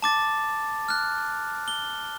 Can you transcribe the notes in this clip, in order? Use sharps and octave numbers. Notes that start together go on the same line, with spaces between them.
A5 D6 A6
F6 F#6
G7